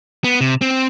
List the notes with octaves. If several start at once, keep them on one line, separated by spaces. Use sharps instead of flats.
B3
C3
C4